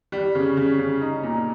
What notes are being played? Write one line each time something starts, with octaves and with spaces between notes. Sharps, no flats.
G3
C#3
C#3
C#3
D#4
A#2